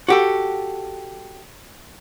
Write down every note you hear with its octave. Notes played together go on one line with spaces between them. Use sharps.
F#4 G4 A4